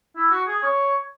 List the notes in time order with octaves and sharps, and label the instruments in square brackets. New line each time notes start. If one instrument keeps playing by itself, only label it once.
[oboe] E4
F#4
G#4
C#5